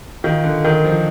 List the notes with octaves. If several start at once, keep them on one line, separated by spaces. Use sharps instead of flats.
D#3 F4
D3
D#3 A#4
F3